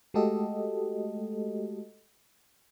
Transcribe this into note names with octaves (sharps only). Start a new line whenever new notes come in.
G#3 A3 F#4 G4 A4 D#5